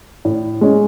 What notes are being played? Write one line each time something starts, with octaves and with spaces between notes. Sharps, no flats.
A2
G#3 C#4